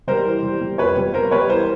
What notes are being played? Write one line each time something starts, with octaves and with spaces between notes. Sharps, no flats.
G3 A#4 C5
E3
G3
G3
F2 B4 C#5
G3
G3 A#4 C5
G3 B4 C#5
E3 A#4 C5